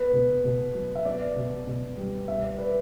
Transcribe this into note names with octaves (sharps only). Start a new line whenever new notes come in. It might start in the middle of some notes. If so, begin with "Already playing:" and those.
Already playing: B3 B4
B2
B2
F#3
E5
B3 D5
B2
B2
G3
B3 E5
D5
B4